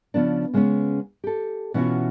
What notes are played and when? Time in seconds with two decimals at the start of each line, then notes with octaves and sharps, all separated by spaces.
0.14 C#3 F3 B3 D4
0.53 C#3 G#3 A#3 B3 C#4
1.24 G4 A4
1.74 B2 E3 C#4 D#4 F4 F#4